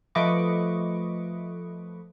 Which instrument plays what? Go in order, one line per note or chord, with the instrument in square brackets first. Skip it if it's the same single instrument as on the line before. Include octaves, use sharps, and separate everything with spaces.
[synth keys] F3 A3 B4 D#5 C#6 D6